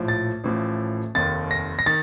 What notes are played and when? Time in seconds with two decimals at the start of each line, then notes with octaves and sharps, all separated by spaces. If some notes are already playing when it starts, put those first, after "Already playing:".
Already playing: A#1 A2 F3
0.08 A6
0.44 A1 A2 F3
1.15 F1 D#2 D#3 A6
1.51 A#6
1.79 A#6
1.86 D#3 A6